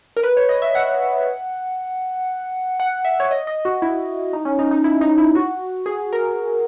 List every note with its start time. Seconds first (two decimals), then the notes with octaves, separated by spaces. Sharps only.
0.17 A#4
0.23 B4
0.37 C#5
0.49 D#5
0.62 E5
0.75 F#5
2.80 F#5
3.05 E5
3.20 C#5
3.31 D#5
3.47 D#5
3.65 F#4
3.82 E4
4.33 D#4
4.45 C#4
4.59 D#4
4.71 D#4
4.84 E4
5.01 D#4
5.18 E4
5.35 F#4
5.86 G#4
6.13 A#4